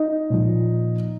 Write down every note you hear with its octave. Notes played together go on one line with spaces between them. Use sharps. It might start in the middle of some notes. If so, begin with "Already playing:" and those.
Already playing: D#4
A#2 F3